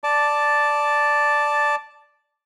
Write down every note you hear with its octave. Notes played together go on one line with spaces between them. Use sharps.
D5 A5